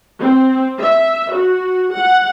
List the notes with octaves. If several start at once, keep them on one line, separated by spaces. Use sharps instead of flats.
C4
E5
F#4
F#5